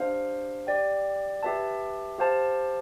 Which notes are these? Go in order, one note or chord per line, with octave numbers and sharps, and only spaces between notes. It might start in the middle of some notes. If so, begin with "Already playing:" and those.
Already playing: D4 G4 C5 F5
G4 D5 G5
G4 B4 E5 A5
G4 C5 F5 A5